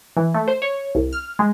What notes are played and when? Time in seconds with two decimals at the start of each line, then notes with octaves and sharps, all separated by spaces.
0.17 E3
0.34 A3
0.48 C5
0.62 C#5
0.95 C2
1.13 F6
1.39 G#3